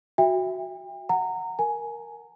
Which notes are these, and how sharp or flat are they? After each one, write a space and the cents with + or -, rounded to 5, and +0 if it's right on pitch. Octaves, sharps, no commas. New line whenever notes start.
F#4 +0 E5 +0 G5 +35
F#5 +0 A#5 -25
A#4 +0 G#5 +10